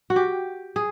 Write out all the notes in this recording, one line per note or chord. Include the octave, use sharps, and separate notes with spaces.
F#4
G4
G#4